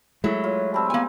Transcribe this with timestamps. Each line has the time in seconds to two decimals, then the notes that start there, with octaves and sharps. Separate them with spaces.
0.24 F#3 G#3 A3 E4
0.44 F4 C#5
0.74 G3 C4 A5
0.90 A#3 B3 G#5